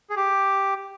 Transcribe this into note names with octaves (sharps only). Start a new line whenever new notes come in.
G#4
G4